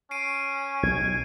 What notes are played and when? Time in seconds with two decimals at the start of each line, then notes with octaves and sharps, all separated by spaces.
0.11 C#4 C7 D7 D#7
0.83 B1 G#6